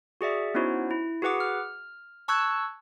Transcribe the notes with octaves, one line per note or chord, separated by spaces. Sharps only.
F#4 G#4 D5 E5
B3 C#4 D#4 E4 F#4 C5
E4
F#4 G#4 B4 F#5 D6
F6
A5 C#6 E6 F#6 G#6